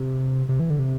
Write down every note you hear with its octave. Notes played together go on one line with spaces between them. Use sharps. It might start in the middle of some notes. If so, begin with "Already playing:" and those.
Already playing: C3
C3
E3
D3
C3